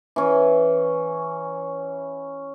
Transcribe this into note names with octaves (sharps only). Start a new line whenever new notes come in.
E3 C#4